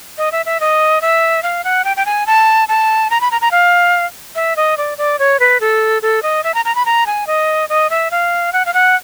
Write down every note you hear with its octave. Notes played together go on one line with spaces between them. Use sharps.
D#5
E5
E5
D#5
E5
F5
F#5
G5
G5
G#5
A5
A5
A#5
B5
A#5
A#5
F5
E5
D#5
D5
D5
C#5
B4
A4
A4
D#5
E5
A#5
A#5
B5
A#5
G#5
D#5
D#5
E5
F5
F#5
F5
F#5